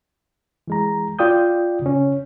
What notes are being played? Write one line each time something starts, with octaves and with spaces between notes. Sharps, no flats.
E3 G#3 A#5
F4 D5 G5 D#6 G6
C#3 C#4